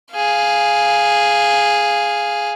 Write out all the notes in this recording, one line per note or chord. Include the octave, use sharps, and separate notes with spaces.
G#4 F5